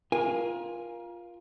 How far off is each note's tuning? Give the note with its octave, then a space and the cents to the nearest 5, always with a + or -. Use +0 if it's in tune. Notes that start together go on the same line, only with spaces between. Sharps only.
F4 +0 A#4 +30 G#5 -15